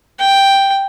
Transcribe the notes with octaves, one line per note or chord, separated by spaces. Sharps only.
G5